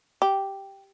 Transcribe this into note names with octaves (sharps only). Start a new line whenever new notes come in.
G4